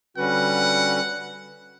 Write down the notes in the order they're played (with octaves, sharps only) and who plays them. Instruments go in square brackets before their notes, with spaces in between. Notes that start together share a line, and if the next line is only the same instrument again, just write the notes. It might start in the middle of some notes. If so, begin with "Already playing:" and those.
[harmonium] D3 G3 C#4 F#4 B4 [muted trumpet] F#5